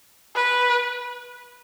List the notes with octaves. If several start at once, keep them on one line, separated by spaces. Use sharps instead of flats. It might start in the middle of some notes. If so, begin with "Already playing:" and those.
B4